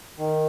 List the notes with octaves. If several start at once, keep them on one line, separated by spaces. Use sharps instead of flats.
D#3